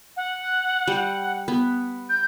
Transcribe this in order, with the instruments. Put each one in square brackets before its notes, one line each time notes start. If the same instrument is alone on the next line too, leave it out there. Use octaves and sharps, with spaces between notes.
[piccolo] F#5
[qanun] G3
B3
[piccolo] G6